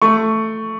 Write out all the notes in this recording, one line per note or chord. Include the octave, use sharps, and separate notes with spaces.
A3 C#6